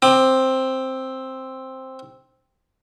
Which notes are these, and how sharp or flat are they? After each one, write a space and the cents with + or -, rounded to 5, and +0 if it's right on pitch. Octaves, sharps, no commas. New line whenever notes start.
C4 +5 D6 +40